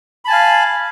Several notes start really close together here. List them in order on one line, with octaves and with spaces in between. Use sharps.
B5 A5 G#5 F5